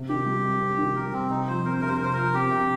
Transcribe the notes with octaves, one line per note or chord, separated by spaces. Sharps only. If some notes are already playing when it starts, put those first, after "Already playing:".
Already playing: C3
D#3 G4
G3
C3
C3
D#3
G3 A#4
C3 C4
C3 D#4
F3 C5
C4 A#4
C5
C3 A#4
C5
C3 A#4
C5
F3 A#4
C4 G4
C3